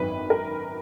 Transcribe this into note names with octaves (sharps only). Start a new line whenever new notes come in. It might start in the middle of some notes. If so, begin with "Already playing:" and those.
Already playing: G#1 F#2 D#3 B4
A#4